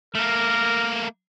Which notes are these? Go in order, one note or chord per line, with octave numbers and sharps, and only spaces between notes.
A3 A#3 A#4